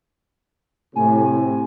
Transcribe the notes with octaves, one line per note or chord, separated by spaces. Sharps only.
A2 C3 G#5